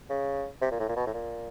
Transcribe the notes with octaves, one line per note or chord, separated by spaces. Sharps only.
C#3
C3
A#2
A2
A#2
B2
A2
A#2